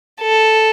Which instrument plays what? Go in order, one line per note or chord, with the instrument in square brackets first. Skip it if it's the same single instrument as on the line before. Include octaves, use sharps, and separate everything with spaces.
[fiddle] A4